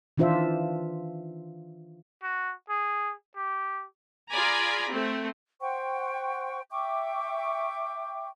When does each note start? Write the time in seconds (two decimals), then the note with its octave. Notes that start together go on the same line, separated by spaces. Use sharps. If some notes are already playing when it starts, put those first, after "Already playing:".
0.18 D#3 E3 D4 F4 C5 E5
2.23 F#4
2.69 G#4
3.36 G4
4.30 F4 G#4 D5 G#5 A#5 B5
4.90 A3 C4
5.61 C5 F#5 G5 C#6
6.71 E5 G5 C#6 D6